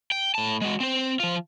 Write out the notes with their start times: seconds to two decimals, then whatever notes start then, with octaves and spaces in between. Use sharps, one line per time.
0.12 G5
0.35 A2 A5
0.62 G#3 F#4
0.80 C4 C5
1.20 F3 F4